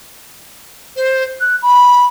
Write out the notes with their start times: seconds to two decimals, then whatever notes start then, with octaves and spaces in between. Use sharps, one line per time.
0.96 C5
1.40 F#6
1.62 B5